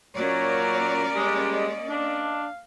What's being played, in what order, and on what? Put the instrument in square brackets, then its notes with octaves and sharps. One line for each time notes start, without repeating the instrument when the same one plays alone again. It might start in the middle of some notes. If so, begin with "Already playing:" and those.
[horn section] A#2 F#3 [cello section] A#3 C#4 D5 [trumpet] A#4 [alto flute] C#5
[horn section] G3 G#3 [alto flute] D#5
[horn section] D4 [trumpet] F5